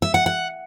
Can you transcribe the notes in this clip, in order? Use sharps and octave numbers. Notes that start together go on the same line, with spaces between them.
E5
F#5
F#5